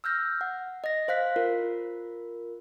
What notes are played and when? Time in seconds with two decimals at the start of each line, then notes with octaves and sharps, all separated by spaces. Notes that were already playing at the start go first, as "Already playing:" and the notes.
0.04 E6 F6 G6 A#6
0.41 F#5
0.84 D#5 A#6
1.08 C5 F5 F#6 B6
1.36 F4 A#4